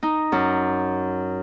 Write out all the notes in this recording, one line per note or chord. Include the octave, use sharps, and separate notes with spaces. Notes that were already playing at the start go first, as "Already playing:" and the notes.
D#4
F#2